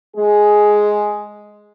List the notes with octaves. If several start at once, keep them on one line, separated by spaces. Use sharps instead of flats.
G#3 G#4